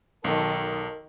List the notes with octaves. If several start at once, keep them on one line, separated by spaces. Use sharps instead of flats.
B1 D#3 A4 A#4